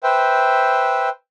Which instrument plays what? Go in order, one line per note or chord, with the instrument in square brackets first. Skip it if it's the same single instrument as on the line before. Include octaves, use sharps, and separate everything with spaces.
[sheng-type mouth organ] B4 C5 E5 G5